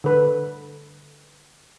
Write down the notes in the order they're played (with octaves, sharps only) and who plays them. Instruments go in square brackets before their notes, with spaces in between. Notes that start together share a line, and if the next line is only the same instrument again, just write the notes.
[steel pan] D3 A4 B4